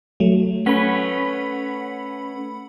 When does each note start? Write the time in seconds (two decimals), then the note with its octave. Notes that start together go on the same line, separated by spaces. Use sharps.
0.20 F#3 A3
0.66 A3 C#4 B4 F#5 B5